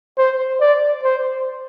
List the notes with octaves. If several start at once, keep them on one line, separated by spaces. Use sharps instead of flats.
C5
D5
C5